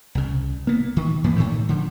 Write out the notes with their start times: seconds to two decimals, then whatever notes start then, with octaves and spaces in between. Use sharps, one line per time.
0.15 C2 C#3
0.67 A#3 B3
0.97 D#3
1.24 G2 E3 A#3 B3
1.36 A2 D#3 A3
1.69 D3 F3